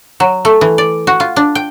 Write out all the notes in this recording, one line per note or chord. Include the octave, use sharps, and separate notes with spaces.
F#3
A3
E3
D5
F#4
F4
D4
G5